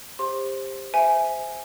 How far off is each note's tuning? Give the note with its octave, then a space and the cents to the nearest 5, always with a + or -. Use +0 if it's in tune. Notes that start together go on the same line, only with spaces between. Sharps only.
G4 +20 C5 +15 C6 +20
C5 -25 E5 +0 G#5 +0